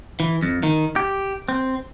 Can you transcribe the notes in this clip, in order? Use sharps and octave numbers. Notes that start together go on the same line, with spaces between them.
E3
F2
D#3
G4
C4